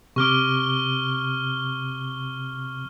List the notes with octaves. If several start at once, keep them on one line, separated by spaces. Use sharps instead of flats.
C3 C#6 D6 F6 G7